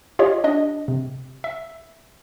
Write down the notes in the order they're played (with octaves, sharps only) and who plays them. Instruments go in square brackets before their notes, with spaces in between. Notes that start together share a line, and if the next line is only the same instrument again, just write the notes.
[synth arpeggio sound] F4 G4 C#5 D#5
D4 D#5
C3
E5